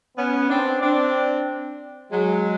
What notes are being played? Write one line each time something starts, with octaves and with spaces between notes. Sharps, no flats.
B3 C#4
C4 D4
C4 D4
F#3 G#3